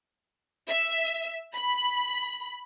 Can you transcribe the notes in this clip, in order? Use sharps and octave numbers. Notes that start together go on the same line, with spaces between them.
E5
B5